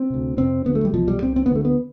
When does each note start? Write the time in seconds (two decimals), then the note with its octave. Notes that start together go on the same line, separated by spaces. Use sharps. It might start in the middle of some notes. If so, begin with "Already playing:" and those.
Already playing: C4
0.10 D2 C3
0.37 F2 C3 C4
0.66 D2 D3 B3
0.75 A3
0.85 G3
0.94 C2 B2 F3
1.08 G3
1.22 C2 C3 C4
1.36 C4
1.46 B3
1.51 D2 D3 A3
1.65 B3